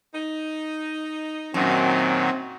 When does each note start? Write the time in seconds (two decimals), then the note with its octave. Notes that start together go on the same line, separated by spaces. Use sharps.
0.15 D#4
1.54 F#2 A#2 D#3 F#3 C4